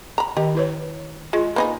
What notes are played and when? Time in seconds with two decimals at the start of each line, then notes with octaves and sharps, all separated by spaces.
0.18 A#5 B5
0.37 D#3 G4 D#5
0.55 E4 B4 C#5
1.33 G#3 F4
1.56 A#3 D#4 G#4 B4 B5